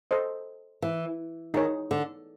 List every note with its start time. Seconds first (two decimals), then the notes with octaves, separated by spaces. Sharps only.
0.11 A4 C5 D#5
0.82 E3
1.54 D#3 D#4 G#4 C#5
1.91 D3